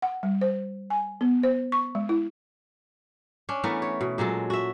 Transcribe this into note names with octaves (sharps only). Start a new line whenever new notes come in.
F#5
G3
C5
G#5
B3
C5
C#6
G#3
E4
C#4 D4
E3 A3 B3 A#4
C#5
B2
A#2 F#3 G#3 A4
F#4 E5